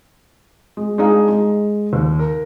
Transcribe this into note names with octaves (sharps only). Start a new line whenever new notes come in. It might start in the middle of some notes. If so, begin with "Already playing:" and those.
G#3
G#3 D4 D#4 G#4 F5
G#3
D#2
A#4